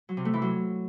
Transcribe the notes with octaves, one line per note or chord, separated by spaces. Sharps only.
F#3
C3
A3
E3
F#3